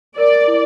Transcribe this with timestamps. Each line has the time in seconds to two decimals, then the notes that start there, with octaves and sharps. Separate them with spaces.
0.17 A#4 D5
0.47 E4